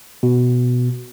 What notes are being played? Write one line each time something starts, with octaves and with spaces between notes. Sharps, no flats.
B2